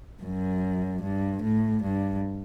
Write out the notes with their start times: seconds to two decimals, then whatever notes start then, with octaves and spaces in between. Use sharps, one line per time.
0.23 F#2
1.02 G2
1.42 A2
1.82 G2